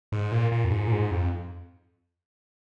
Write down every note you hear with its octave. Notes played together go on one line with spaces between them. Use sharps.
G#2
A#2
A#2
F2
G#2
A#2
G#2
F2